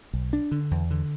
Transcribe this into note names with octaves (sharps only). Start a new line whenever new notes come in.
B1
D4
D3
E2
D3